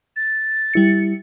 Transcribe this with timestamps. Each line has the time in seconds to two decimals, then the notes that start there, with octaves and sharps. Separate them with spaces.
0.16 A6
0.74 G3 E4 C#7